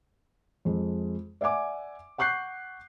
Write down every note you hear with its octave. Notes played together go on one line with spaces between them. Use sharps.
F2 G#3
D5 E5 F#5 G#5 D6
F#5 C#6 F#6 G6 C7